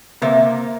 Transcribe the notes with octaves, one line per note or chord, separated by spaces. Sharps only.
C3 A#3